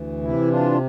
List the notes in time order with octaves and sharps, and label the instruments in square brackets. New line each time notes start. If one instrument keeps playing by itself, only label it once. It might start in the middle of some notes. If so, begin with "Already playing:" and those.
Already playing: [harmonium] D2 E3
C3 E4
D4 F4